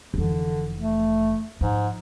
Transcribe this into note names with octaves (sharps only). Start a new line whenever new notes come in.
F1 D3 E3
A3
G#2 F3